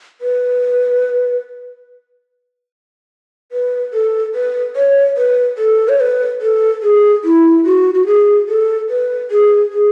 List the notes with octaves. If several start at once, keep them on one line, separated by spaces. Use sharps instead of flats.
B4
B4
A4
B4
C#5
B4
A4
C#5
B4
A4
G#4
E4
F#4
F#4
G#4
A4
B4
G#4
G#4